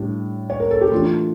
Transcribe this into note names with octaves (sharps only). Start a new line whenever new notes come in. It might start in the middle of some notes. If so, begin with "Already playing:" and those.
Already playing: A2 G3 D4
C#5
A#4
A4
G4
E3 A3 D4 F4